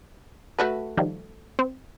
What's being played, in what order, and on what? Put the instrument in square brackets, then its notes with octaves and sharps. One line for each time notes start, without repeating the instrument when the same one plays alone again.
[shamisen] A3 F#4 B4
[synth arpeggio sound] D#3 F3 G3
C4